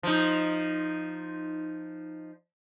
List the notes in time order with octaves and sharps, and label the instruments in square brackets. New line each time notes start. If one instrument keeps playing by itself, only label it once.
[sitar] F3 D#4